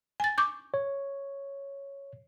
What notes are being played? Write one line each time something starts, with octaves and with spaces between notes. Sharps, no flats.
G#5 A6
C#6 D6 G6
C#5